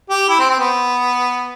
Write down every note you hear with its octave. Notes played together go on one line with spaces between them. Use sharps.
G4
E4
C4
C4
B3